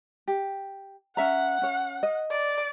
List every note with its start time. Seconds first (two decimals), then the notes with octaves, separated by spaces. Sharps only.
0.28 G4
1.17 C#4 E5 F#5 A#5
1.62 C#4 C#5
2.03 D#5
2.31 D5